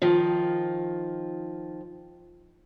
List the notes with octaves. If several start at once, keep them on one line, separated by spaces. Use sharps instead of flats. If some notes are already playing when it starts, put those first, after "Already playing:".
D#3 F3